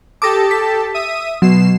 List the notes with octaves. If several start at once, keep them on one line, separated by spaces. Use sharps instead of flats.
G4 A4 A5 D6 D#6 A#6
B6
E5 D#6 D#7
B2 F#3 C7 E7